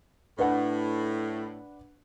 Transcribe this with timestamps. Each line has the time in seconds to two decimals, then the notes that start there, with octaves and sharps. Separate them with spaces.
0.39 A2 D4 B4 F#5